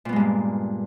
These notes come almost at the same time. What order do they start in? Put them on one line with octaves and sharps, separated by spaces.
A#2 B3 G#3 G2 A#3